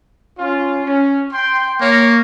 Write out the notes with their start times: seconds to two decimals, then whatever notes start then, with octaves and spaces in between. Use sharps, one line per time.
0.38 C#4 F4
0.85 C#4
1.33 G5 C6
1.81 A#3 C#5